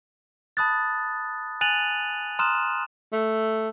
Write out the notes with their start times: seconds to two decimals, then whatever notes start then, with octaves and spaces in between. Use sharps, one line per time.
0.57 A5 B5 D#6 F#6 A6
1.61 G#5 F#6 A6 D#7 F7 F#7
2.39 A#5 C6 D#6 F6 F#6 E7
3.13 A3